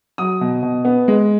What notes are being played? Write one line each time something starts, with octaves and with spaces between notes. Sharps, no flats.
F#3 D#6
B2
B2
B3
G#3